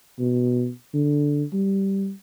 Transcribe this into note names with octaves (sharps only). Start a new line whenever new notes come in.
B2
D3
G3